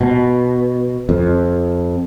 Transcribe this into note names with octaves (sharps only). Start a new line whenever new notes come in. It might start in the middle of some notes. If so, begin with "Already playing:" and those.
B2
F2